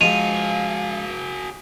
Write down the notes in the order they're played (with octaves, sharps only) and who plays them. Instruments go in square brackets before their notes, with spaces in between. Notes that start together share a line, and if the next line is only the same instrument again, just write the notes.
[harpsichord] F3 G#3 [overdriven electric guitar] F#4 G#4 [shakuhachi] F5 [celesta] D#7 F7